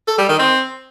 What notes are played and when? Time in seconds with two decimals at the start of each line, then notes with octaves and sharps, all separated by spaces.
0.08 A4
0.18 G3
0.29 D#3
0.39 C4